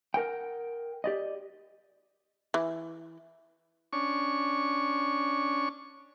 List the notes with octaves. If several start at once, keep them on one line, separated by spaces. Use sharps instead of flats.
A#4 F#5 G5
G4 D5 D#5
E3
C#4 D4 C#6